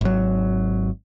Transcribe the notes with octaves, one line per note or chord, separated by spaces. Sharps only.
G#1 F#3